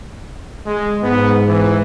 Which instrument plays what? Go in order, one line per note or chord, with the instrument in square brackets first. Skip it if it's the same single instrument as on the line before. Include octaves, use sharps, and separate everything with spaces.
[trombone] G#3
[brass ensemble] G#2 [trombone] B3
[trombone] E3